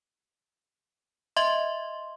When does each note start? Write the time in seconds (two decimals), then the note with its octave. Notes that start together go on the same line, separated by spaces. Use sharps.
1.36 D#5 E5 C6